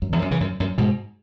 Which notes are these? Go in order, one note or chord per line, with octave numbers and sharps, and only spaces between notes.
F#2
E2
F#2
C#3 E3
F#2
F#2
G#2 B2